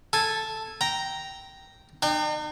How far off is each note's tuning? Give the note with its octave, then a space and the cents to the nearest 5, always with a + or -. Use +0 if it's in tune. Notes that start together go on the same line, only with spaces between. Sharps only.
A4 +0 G#5 -10
G5 -10 A#5 +0
D#4 -45 G5 +20